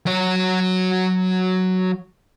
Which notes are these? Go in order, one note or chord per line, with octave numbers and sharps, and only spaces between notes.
F#3 C#5